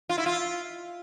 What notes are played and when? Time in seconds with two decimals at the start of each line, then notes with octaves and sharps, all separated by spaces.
0.09 F4
0.18 E4
0.26 F4